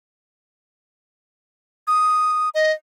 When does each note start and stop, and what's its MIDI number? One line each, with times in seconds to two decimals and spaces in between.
1.87 2.49 87
2.54 2.72 75